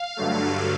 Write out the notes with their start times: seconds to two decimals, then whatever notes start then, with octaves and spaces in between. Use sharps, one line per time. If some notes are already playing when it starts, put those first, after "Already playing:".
Already playing: F5
0.17 G2 D3 F#3 A3